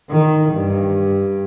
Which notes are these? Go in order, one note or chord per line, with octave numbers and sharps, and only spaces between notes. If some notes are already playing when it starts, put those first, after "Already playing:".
D#3
G2